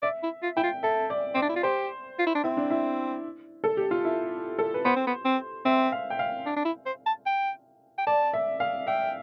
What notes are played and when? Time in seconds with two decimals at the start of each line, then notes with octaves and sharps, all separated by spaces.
0.02 D5 E5
0.23 E4
0.43 F4
0.57 E4 G5
0.63 F4
0.83 A4 E5
1.10 D5
1.35 C4 D5
1.42 D4
1.49 E4
1.56 F4
1.63 G4 C5
2.19 F4
2.27 E4
2.35 D4
2.44 C4 E4
2.57 D4
2.70 E4
3.64 A4
3.77 G4
3.91 F4
4.05 E4
4.59 A4
4.74 B4
4.85 B3 C5
4.96 C4
5.07 B3
5.25 C4
5.65 C4 E5
5.92 F5
6.10 G5
6.19 F5
6.46 D4
6.57 D4
6.65 E4
6.86 C5
7.06 A5
7.26 G5
7.98 G5
8.07 D5 A5
8.33 E5
8.60 F5
8.87 E5 G5